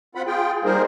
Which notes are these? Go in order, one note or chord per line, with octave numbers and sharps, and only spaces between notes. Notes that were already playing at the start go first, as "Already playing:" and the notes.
C4 F4 F#5 B5
F4 G#4 G5
G3 A#3 D#4 G#4 A#4 C5